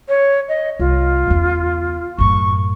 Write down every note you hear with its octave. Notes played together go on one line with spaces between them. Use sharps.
C#5
D#5
C2 F4
E2 C#3
F#2 A2 C#6